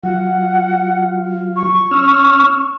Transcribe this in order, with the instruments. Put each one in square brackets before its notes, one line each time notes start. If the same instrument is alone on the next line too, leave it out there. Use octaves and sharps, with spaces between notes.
[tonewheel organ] F#3 F4 [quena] F#5
[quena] C#6
[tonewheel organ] C#4 E6 F6